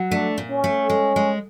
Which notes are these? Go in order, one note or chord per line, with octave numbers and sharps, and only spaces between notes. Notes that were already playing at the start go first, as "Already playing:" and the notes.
Already playing: F#3
A3 D4
A#2
C#4
A3
G#3
G#3